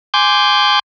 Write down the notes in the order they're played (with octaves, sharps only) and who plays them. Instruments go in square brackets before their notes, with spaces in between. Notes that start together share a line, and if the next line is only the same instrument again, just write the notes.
[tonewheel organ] G#5 C6 D6 G6